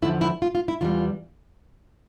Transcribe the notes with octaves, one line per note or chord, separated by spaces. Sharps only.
E2 D3 F3 E4
E4
F4
F4
E4
E2 E3 G3 F4